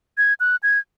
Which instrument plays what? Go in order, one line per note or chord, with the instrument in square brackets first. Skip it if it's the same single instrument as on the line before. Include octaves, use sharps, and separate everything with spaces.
[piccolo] G#6
F#6
G#6